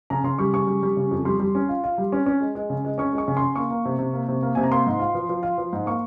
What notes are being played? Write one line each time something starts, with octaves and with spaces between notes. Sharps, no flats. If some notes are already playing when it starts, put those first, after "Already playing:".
C#3 A#5
C#3 C6
G3 C#6
C#3 C#6
G3
G3
C#3
F2
G3 C6
G3
C#4
F4
F4
G3
C#4
C#4
G#3
G#3
C#3
G#3
C#4 C#6
G#3
C#6
C#3
C6
C#3
A#3 C#6
A#3
C3
C3
A#3
C3
A#3
C3 G#5
A#5
A#3 C6
G#2
F4
F3
F3
F4
F3
G#2
A#3 C#6